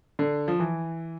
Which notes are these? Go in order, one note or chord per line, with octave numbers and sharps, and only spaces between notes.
D3
F3
E3